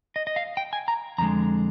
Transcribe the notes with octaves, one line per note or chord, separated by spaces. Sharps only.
D#5
D#5
F5
G5
G#5
A#5
F2 D3 G#3 A#5